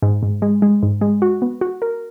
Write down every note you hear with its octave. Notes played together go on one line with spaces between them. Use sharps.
G#2
G#2
G#3
G#3
G#2
G#3
F#4
B3
F#4
A#4